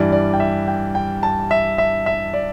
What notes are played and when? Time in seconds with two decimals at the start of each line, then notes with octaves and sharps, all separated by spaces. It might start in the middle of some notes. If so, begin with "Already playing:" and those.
Already playing: G2 E3 G3 D5
0.12 D5
0.34 G5
0.40 E5
0.68 G5
0.95 G5
1.23 A5
1.51 E5
1.78 E5
2.06 E5
2.34 D5